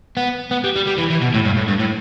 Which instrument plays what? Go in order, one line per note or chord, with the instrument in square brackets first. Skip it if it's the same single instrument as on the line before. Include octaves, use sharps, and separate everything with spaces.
[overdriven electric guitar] B3
B3
G3
G3
G3
E3
E3
B2
A2
G2
A2
G2
A2